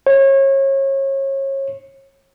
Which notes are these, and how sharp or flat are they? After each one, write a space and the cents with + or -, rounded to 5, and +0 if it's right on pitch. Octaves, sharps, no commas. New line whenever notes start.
C#5 -30